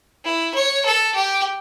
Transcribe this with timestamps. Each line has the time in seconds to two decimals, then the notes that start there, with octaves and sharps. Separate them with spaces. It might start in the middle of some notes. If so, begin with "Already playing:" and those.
0.25 E4
0.55 C#5
0.85 A4
1.15 G4